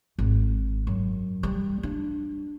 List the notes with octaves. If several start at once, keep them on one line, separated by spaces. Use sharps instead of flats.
G#1
F#2
G3
D4